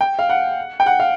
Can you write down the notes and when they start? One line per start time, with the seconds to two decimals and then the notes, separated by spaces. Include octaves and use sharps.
0.01 G5
0.19 F5
0.29 F#5
0.80 G5
0.86 F#5
1.00 F5